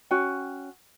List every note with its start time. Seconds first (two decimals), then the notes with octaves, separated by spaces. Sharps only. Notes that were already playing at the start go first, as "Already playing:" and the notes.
0.11 C#4 F#4 G5